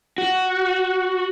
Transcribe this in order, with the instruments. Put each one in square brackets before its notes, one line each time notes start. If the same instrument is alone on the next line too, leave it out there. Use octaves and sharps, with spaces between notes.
[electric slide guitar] F#4